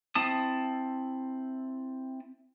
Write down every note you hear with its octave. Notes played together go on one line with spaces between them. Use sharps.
C4 E4 A5 D#6